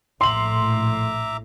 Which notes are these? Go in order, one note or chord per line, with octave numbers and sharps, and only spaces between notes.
A#1 A2 E5 A#5 C6 D6 F#7